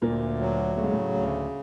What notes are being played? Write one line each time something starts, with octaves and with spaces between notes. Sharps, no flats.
D2 A#2 A#3
F#3
C#3 A3
G#3
A2 A3
D2